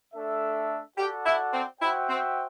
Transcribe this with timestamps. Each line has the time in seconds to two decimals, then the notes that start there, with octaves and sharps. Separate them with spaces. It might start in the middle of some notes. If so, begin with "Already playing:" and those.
0.14 A3 D4 A4 E5
0.97 F#4 G4 A4 D5 F#5
1.26 E4
1.54 C4
1.80 E4 F#4 C5 E5 G5
2.09 C4